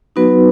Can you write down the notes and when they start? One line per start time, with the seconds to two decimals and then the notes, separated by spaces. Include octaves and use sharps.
0.16 F#3 B3 D#4 F#4 B4